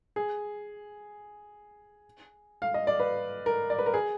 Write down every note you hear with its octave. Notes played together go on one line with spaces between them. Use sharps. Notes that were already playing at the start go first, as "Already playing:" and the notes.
G#4
F5
D#5
D5
B4
A#4
D5
B4
A#4
G#4